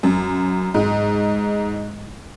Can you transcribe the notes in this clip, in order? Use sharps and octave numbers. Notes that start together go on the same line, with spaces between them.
F#2
G#2